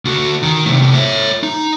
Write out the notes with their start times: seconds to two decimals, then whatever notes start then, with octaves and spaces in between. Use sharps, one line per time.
0.05 D2 F#4
0.42 D#3 D#4
0.66 A2 C3
0.94 C#5 E5
1.43 D#4